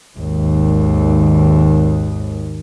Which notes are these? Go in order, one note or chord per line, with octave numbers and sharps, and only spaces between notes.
G#1 D#2